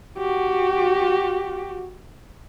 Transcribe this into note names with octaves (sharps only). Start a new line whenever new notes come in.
F#4 G4